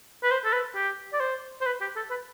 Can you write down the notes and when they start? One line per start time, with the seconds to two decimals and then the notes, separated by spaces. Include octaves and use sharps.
0.23 B4
0.31 C5
0.44 A4
0.53 B4
0.75 G4
1.13 D5
1.20 C5
1.61 C5
1.66 B4
1.81 G4
1.96 A4
2.10 B4